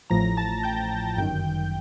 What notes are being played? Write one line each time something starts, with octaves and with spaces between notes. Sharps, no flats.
A1 A2 F3 A#5 A#6
A5 A6
G5 G6
G1 F#2 D#3 G5 G6